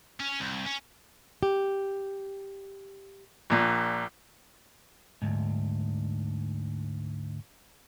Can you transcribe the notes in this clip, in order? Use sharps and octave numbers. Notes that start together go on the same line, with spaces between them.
C#4
C2
C#4
G4
A#1 A#2
D2 G#2